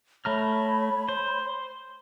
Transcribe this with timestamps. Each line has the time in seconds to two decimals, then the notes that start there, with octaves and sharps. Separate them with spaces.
0.25 A3 C#5 A#5 B5 F6
1.09 C5